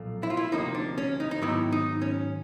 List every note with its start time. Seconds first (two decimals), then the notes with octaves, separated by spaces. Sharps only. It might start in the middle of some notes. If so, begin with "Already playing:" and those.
Already playing: B1 A#2 F3 A3
0.23 E4
0.30 F4
0.37 E4
0.52 D2 C3 F3 A#3 D#4
0.75 D4
0.98 C#4
1.20 D#4
1.31 D#4
1.42 G#2 D#3 F#3 B3 E4
1.72 D#4
2.02 C#4